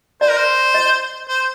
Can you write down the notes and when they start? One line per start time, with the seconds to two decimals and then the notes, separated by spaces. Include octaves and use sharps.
0.21 C5 D5
0.30 A#4
0.37 C5
0.74 D#5
1.29 C5